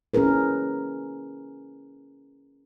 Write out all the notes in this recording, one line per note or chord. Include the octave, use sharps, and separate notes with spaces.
C#4 E4 G#4 A#4 B4